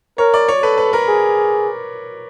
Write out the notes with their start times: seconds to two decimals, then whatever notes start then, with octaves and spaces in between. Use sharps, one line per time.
0.18 A#4 C#5
0.34 D5
0.48 C#5
0.63 A4 B4
0.78 B4
0.93 A#4
1.08 G#4